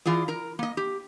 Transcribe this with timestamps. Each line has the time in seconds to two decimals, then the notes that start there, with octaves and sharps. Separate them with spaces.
0.06 E3 F4 G#4 D5
0.28 A#4 A#5
0.59 A#3 D#5
0.77 G4